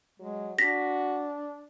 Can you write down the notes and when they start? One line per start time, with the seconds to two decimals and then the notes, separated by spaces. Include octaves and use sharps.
0.20 F#3 G#3
0.59 D4 F#4 A#6 B6